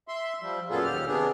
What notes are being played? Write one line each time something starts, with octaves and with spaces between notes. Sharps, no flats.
E5 C6
F3 G3
F#2 A#2 B3 F4 G#4 A4
D#2 G4 F6
C3 B3 D4 G#4